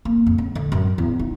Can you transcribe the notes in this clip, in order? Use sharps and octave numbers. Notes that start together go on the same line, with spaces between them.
A#3
F2
C#3
D3
F#2
E2
D#4